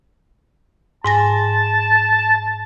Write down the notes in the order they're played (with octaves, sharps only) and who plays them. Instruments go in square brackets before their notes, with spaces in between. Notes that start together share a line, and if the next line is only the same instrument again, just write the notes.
[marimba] G#2 G#5 A#6 [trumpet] A5